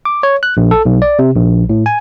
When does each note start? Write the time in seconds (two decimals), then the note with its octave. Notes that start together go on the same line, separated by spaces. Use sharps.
0.05 D6
0.23 C#5
0.43 F#6
0.57 A#1
0.71 A4
0.86 B1
1.02 D5
1.19 C3
1.36 A#1
1.70 A2
1.86 G#5